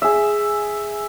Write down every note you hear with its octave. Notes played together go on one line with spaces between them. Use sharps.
G#4 E5